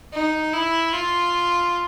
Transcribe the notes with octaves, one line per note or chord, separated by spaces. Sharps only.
D#4
E4
F4